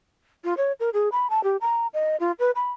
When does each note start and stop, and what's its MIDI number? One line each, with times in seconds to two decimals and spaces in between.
0.44 0.54 65
0.57 0.72 73
0.80 0.90 70
0.93 1.09 68
1.12 1.29 83
1.30 1.42 81
1.43 1.57 67
1.61 1.87 82
1.94 2.16 75
2.20 2.32 65
2.39 2.51 71
2.55 2.71 83